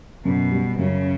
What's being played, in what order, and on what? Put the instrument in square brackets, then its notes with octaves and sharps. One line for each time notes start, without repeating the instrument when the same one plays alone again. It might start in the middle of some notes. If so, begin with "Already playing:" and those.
[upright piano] F#2 [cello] B2
[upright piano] G3
[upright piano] F#2 [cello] C#3